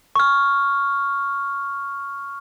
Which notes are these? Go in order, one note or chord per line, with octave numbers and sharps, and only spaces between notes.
C#6 F6